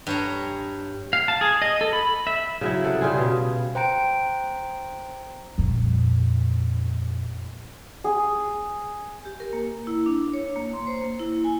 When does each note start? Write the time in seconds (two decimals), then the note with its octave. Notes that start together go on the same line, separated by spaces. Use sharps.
0.07 G2 C#5 A#5
1.13 F5
1.28 A5
1.41 G#4
1.62 D#5
1.81 A4
1.93 B5
2.27 E5
2.61 C#3 F#3 E4
2.84 C3 A4 F#5
3.01 C#3 G3 F4 G#4
3.18 B2
3.75 C5 G5 A#5 D7
5.58 F2 A#2
8.04 G#4
9.25 G4
9.40 A#4
9.53 A#3
9.87 E4
10.06 D4
10.33 C#5
10.56 A#3
10.73 C6
10.87 C5
11.01 A#3
11.19 E4
11.44 G#5